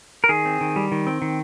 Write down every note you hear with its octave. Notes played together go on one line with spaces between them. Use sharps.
A#4
D#3 G#4
C4
D#3
G3
D#3
C4
D#3